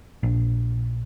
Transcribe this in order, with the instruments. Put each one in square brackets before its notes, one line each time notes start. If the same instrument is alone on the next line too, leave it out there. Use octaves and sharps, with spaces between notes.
[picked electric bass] A#1